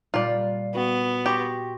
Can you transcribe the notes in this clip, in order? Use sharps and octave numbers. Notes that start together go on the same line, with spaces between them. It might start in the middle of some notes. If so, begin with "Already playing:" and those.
A#2 G3 F4 D5 F#6
B3 F#4
G4 C6 C#6 A#6